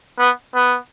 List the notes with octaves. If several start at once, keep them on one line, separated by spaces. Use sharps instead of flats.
B3
B3